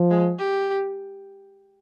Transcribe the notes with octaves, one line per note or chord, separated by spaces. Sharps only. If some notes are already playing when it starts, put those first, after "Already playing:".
Already playing: F3
G#3
G4